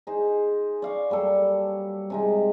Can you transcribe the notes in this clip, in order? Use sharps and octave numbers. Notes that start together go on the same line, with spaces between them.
D#4 G#4 C5
D5 F5 C#6
F#3 G3 A#3 A4
C3 G#3 D#4